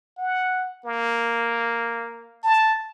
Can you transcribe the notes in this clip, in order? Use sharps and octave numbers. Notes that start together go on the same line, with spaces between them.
F#5
A#3
A5